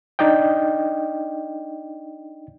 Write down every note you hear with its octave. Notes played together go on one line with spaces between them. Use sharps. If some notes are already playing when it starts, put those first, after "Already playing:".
D4 D#4 D5 D#5 G5